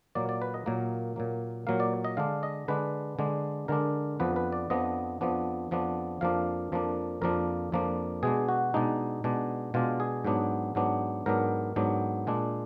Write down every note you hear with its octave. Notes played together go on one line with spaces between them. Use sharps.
A#2 F#3 A#3 D5
D5
B4
D#5
A#2 F#3 A#3
A#2 F#3 A#3
A#2 F#3 A#3 F5
D5
D#5
D3 G#3 D4 F5
D#5
D3 G#3 D4 B4
D3 G#3 D4
D3 G#3 D4 A#4
F2 F3 B3 D4 B4
B4
D5
F2 F3 B3 D4 D#5
F2 F3 B3 D4
F2 F3 B3 D4
F2 F3 A#3 D4 F5
F2 F3 A#3 D4
F2 F3 A#3 D4 A#4
F2 F3 A#3 D4
B2 G#3 D4 G#4
F#4
B2 G#3 D4 D#4
B2 G#3 D4
B2 G#3 D4 F4
G#4
G#2 F#3 B3 D4
G#2 F#3 B3 D4
G#2 F#3 B3 D4 A#4
G#2 F#3 B3 D4
A#2 G#3 D4